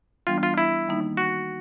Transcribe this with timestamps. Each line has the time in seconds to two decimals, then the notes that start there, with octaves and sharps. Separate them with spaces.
0.27 E3 G3 B3 D4 F4
0.43 F4
0.58 E4
0.88 D#3 G3 A#3 D#4
1.17 F#4